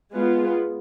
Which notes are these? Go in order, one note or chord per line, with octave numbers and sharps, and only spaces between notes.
G#3 B3 F4